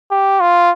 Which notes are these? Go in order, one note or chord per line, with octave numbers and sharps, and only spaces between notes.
G4
F4